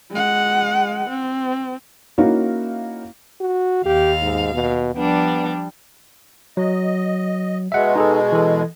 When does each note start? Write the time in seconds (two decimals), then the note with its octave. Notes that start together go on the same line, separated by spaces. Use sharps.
0.11 G#3 F#5
1.09 C4
2.18 A#3 C#4 D#4 E4 F#4 F5
3.41 F#4
3.86 D#2 G4 F5
4.22 G#2
4.54 B2
4.95 F3 G3 B3 D4
6.57 F#3 D#5
7.72 B2 G#3 E5 F#5
7.96 D#4 G#4 A4
8.32 E3 A4